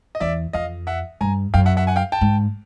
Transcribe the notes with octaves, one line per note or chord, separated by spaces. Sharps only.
D#5
E2 D5 E5
F2 D#5 F5
E5 F#5
G2 G#5 A#5
F#2 F5 G5
E5 F#5
E5 F#5
F#5 G#5
F5 G5
G5 A5
G#2